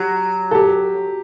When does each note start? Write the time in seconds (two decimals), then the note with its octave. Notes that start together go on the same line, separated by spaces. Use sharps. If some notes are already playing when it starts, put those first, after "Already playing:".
Already playing: F#3 G4
0.51 A4
0.55 G4